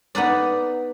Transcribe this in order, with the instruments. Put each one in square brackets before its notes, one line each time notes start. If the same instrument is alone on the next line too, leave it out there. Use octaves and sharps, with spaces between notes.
[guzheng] B3 D#4 B4 D5